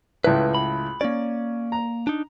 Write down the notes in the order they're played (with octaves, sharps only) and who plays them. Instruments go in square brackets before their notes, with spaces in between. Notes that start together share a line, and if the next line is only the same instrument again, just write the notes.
[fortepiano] C#2 A2 E4 [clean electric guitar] B4
[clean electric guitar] B5
[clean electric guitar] A#3 D5 [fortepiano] C#4
[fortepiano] A#5
[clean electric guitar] D4 D#4